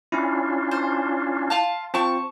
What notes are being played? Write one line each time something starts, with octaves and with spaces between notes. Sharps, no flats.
C#4 D4 E4 F4
C5
F4 F5 A5
C4 F4 C5 A5 C#6